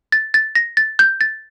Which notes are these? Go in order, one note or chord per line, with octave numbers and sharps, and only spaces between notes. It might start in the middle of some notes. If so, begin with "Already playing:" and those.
A6
A6
A#6
A6
G6
A6